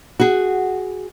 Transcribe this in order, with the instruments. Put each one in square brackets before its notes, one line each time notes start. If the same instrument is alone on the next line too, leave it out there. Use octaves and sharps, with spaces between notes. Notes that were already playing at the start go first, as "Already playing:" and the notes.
[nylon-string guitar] F#4 G#4